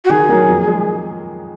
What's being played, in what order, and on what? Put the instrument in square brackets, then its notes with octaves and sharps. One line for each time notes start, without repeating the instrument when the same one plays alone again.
[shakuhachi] F#4
[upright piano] D#3 [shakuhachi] G#4
[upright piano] F#3 A#3
F2
G#3